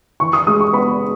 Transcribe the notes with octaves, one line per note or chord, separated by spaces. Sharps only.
E3 C#6
D#6
G#3 D#6
C#6
B3 B5